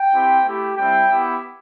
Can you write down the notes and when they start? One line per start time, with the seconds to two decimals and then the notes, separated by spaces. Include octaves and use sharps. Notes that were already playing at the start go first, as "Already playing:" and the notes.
Already playing: G5
0.13 C4 E4 G4
0.45 A3 E4 G4
0.77 G3 C4 E4 G5
1.10 B3 E4 G4